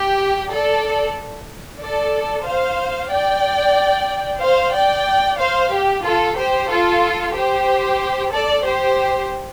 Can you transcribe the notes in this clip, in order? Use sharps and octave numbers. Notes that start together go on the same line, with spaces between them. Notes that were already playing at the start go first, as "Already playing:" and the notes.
Already playing: G4
A4 D5
A4 D5
C5 F5
D5 G5
C5 F5
D5 G5
C5 F5
G4
F4 A4
G4 C5
F4 A4
G4 C5
A4 D5
G4 C5